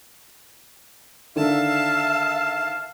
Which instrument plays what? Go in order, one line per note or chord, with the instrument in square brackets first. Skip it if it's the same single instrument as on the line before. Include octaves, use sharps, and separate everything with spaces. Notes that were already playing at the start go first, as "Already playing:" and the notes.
[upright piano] D3 D#3 [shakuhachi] E5 [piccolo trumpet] F5 [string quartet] A5